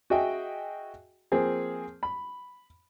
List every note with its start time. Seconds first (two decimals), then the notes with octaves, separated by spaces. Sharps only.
0.10 F#4 G#4 D#5 E5 G5 G#5
1.32 F3 A#3 C4 G#4
2.03 B5